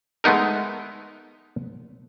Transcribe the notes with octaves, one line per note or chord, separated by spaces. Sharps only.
G#3 A3 B3 D#4 A#4